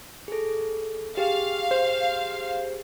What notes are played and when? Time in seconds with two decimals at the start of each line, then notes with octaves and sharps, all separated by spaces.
0.28 G#4 A4
1.17 G4 G#4 F5
1.71 C5